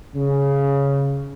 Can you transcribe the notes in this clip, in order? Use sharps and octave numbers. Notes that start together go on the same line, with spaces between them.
C#3